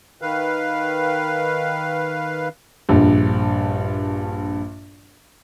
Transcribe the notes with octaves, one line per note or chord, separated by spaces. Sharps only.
D#3 B4 F5
A#1 G2